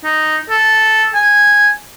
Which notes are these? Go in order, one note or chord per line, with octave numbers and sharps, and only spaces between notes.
D#4
A4
G#5